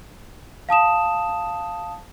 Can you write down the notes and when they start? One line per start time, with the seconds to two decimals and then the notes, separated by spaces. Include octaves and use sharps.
0.69 F5 A5 D#6 E7